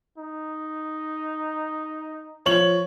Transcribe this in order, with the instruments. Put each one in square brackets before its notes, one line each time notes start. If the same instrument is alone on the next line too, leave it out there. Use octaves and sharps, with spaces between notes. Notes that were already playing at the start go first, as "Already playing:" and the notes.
[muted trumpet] D#4
[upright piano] F3 C#5 F#7